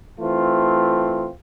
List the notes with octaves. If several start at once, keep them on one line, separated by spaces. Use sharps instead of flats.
E3 A3 C4 F4